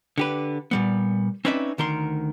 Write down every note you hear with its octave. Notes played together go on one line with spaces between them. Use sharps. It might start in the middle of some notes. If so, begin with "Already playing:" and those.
D3 G4 B4
A#2 G3 B3
C4 C#4 D#4 B4 D5 E5
D2 D#3 A#4 C6